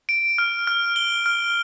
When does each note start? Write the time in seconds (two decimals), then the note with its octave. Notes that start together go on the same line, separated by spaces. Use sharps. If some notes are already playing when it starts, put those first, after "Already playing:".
0.09 D7
0.38 F6
0.67 F6
0.96 G7
1.26 F6